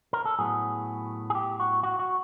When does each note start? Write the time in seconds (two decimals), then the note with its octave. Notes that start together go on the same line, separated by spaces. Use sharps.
0.13 A#4
0.25 A4
0.39 A2 F#3 B3 G#4
1.30 G#4
1.35 G4
1.60 F#4
1.83 F#4
1.99 F#4